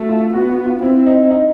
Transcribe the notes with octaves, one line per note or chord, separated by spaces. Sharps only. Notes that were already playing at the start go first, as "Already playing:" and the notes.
Already playing: A3 F#4
F4
B3 F#4
F#4
F4
C4 E4
D#4
D#4